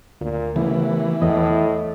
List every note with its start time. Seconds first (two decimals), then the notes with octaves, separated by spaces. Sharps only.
0.21 D2 A#2
0.56 D#2 C#3 E3 A3 B3
1.22 E2 A2 D#5